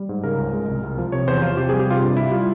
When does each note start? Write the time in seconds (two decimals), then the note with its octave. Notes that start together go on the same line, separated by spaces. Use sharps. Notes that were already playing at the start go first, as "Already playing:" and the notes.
Already playing: G3
0.09 G#2
0.23 C#3 A#4
0.38 C#2
0.53 G#3
0.68 C2
0.83 C2
0.98 F3
1.12 C3 C#5
1.27 E2 C5
1.42 F3 F4
1.57 C3 G4
1.69 G3 G#4
1.80 G4
1.87 C3 F4
2.02 G2
2.17 G3 E4
2.32 G3 F4